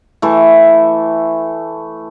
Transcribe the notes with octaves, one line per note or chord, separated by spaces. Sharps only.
E3 A3